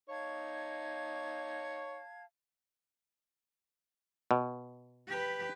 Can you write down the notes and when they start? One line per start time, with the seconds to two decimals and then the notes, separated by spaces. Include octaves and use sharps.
0.09 D#4 C#5 F5 A5 G#6
4.31 B2
5.07 G4 B4